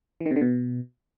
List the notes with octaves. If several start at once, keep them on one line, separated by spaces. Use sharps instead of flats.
E3
D#3
C3
D3
B2